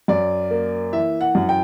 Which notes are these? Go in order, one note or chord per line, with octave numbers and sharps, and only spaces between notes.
F#2 D5
A#3
E3 E5
F#5
F#2
G5